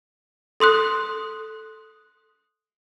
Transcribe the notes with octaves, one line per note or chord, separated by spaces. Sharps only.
A4 C6 D#6 F#6